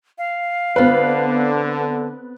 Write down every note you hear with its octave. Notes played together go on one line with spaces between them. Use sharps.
F5
D3 B3 C4 F4 B4